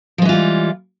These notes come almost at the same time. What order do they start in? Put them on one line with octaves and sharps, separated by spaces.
F3 G#3 E3 F4 G3